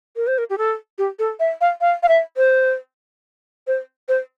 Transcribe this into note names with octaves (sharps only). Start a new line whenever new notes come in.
A#4
C5
A#4
G4
A4
G4
A4
E5
F5
F5
F5
E5
C5
C5
C5